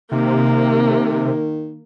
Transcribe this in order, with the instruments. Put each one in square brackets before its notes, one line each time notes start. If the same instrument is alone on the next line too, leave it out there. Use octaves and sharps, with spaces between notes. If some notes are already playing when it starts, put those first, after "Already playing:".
[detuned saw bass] C3 [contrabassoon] D#3 [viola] A#3